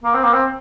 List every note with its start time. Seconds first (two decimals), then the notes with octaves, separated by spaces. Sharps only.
0.04 A#3
0.14 C4
0.24 A#3
0.33 C4